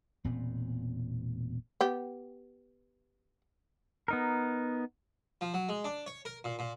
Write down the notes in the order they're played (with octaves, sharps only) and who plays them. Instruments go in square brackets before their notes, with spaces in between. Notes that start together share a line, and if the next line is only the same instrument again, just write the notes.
[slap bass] E1 A#2 B3 C4
[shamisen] B3 G4
[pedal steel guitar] B3 D#4 A#4
[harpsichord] F3
F#3
G#3
D4
C#5
A#4
A#2
A#2